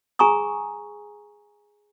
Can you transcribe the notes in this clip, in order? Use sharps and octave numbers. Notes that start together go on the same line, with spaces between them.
G#4 G#5 A#5 C#6 D#6